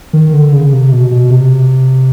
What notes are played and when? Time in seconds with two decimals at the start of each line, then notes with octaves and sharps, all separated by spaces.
0.13 D#3
0.33 D3
0.52 C#3
0.73 C3
0.92 B2
1.12 B2
1.30 C3